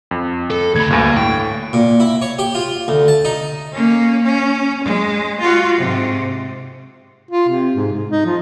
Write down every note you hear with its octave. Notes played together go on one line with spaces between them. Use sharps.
F2
A4
D2 B5 G#6
D2 G2 A#3
A2 G5
A#2
E4
C#5
G4
F4
D2
A5
D#4
A#3 C#4
C#4
G#3
F4 F#4
G#2 C3
F4
C3
G#2
G#2
D#4
F3